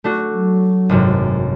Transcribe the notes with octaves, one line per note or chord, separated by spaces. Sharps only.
A3 D4 F#4
F#3
G#1 F#2 C3